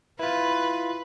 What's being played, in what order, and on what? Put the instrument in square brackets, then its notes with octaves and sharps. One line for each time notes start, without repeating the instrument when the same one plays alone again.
[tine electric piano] E4 F4 [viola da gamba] B4